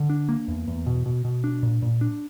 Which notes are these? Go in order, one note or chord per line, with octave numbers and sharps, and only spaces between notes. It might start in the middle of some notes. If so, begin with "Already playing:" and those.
Already playing: D3
D4
A#3
E2
E2
B2
B2
B2
D4
A#2
A#2
D4